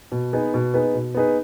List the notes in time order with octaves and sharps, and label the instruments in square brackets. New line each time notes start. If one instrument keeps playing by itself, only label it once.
[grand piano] B2
B3 D#4 G#4 B4
B2
B3 D#4 G#4 B4
B2
B3 D#4 G#4 B4